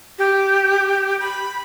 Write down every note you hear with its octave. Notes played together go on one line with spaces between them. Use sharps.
G4
B5